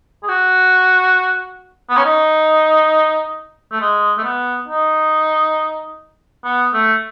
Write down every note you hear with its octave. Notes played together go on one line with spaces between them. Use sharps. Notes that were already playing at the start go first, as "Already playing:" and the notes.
G#4
F#4
B3
C#4
D#4
A3
G#3
A3
B3
D#4
B3
A3